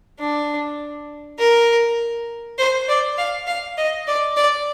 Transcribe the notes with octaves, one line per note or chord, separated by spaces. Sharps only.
D4
A#4
C5
D5
F5
F5
D#5
D5
D5